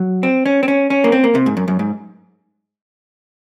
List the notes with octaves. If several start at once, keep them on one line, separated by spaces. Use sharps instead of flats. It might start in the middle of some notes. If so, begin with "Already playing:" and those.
Already playing: F#3
C4
C#4
C4
C#4
C#4
A#3
C4
A#3
C3
G#2
F#2
F#2
G#2